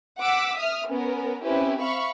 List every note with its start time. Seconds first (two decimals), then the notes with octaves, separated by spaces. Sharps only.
0.19 F#5 D6 E6 B6
0.57 E5 D#6 F6
0.87 B3 C#4 A#4
1.43 C4 C#4 E4 G4 B4
1.81 E5 F5 B5 C#6